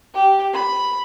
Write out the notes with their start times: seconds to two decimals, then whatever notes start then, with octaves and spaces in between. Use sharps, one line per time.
0.14 G4
0.54 B5